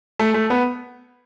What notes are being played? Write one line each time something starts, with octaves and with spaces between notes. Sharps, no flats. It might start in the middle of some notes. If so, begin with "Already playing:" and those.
A3
A3
B3